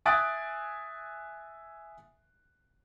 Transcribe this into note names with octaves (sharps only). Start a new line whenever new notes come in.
E5 G#5 D#6 F#6 A6 D7